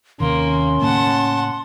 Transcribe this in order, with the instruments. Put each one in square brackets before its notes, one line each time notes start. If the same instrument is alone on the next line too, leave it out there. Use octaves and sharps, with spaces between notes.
[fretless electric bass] D#2 C3 D#3 [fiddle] A#3 [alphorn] C#4 [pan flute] C6
[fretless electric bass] A2 C#3 A#3 [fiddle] F#5 A5